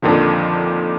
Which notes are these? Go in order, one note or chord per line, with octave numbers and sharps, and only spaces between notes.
F2 A#2 D3 D#3 F3